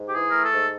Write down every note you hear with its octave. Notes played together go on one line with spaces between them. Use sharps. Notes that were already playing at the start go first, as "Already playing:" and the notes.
Already playing: G#2
G4
E3 G#4
A3 A#4
A4
G#2